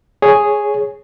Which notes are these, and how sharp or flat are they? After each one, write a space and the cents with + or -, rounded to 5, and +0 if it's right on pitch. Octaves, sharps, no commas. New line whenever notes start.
G#4 +0 C#5 +0